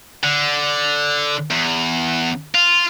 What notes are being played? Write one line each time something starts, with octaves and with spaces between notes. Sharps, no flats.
D3
E2
F4